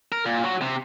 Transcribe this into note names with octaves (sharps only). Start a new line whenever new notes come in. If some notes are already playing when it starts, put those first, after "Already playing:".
A#4
A#2
F#3 F#4
C3